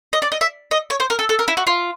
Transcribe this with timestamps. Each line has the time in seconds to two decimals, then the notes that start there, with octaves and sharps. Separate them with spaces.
0.13 D#5
0.22 D5
0.32 D#5
0.41 E5
0.71 D#5
0.90 C#5
1.00 C5
1.10 A#4
1.19 A4
1.29 A4
1.39 A#4
1.48 E4
1.57 F#4
1.67 F4